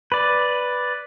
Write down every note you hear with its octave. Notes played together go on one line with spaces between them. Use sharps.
B4 D5